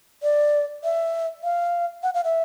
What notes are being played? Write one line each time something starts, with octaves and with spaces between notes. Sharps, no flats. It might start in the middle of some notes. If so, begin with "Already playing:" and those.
D5
E5
F5
F#5
F5
E5